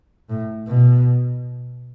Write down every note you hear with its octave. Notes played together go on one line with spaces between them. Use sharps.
A2
B2